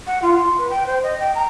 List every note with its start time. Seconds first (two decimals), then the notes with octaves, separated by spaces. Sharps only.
0.07 F#5
0.22 F4
0.39 C6
0.58 B4
0.70 G5
0.86 C5
1.03 D#5
1.20 G5
1.35 A#5